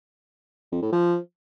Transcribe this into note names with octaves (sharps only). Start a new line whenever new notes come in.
F2
A2
F3